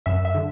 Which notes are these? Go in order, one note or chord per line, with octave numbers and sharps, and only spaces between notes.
F#2 E5
E5
D3